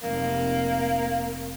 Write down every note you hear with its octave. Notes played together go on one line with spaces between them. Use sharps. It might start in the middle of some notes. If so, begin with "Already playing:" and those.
F1 A#3